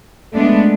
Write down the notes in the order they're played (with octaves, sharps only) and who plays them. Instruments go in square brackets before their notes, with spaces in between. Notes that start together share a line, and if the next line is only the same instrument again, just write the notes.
[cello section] G#3 B3 D4 [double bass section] A3